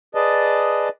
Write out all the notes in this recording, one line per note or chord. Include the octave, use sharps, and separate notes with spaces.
G#4 B4 D5 D#5 A5